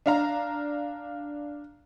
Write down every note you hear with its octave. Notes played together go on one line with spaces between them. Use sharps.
D4 F5 A#5